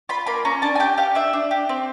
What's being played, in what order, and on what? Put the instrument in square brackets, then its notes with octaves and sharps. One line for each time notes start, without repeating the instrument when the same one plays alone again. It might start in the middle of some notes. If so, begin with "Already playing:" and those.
[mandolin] F4 B5
A#3 B5
C#4 A#5
D4 A5
G#5
G4 G5
G4 F5
D4 E5
D4
G4
C4